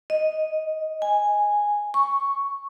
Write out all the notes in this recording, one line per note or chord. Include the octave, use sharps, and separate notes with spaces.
D#5
G#5
C#6